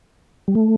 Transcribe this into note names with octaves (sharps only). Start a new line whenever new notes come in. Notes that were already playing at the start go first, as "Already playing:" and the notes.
G3
A3